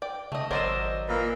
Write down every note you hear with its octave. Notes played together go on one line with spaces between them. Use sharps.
D5 G5
C#3 A3 D#5
G#1 F#3 A#4 C5 D5 D#5 E6
A#2 E3 A#3